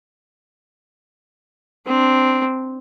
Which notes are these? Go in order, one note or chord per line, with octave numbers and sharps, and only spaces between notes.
C4 D4